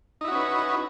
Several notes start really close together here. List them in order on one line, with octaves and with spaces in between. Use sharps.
D#4 E4 F#4 C#4 B4